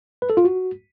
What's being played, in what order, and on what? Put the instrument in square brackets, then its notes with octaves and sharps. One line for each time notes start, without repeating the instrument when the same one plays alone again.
[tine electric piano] B4
A4
F4
F#4